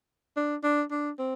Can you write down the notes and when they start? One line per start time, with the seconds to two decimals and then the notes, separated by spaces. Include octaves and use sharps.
0.37 D4
0.63 D4
0.91 D4
1.19 C4